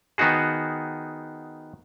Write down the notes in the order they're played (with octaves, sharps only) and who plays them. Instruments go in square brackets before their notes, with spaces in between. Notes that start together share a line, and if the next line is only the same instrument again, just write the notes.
[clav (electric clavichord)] D#3 B3 D#4 F#4 G#4